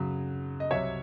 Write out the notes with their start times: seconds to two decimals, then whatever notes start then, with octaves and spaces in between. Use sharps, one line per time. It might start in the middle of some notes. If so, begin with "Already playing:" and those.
Already playing: F#2 C#3 F#3
0.60 D#5
0.71 C2 C3 F#3 C#5 E5